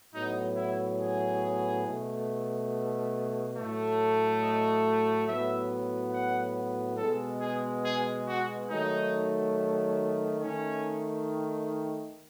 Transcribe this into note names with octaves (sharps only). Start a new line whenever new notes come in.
A2 F#3 B3 D#4
E4
G#4
B2 A3
A2 F#3 A3
D#5
A2 F#3 B3 E5
F#5
B2 G#3 B3 A4
G#4
G#4
F#4
D#3 F#3 A3 D#4
D#3 A3 C#4